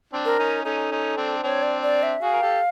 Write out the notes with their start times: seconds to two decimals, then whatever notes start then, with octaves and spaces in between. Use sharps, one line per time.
0.13 C4 D4
0.25 A#4
0.39 C#4 D#4
0.65 C#4 D#4 A4
0.91 C#4 D#4
1.17 C4 D4
1.43 C4 D4 C#5
1.63 D5
1.82 D5
2.03 E5
2.22 F#4 G#4 F5
2.33 A#4
2.42 G4 A4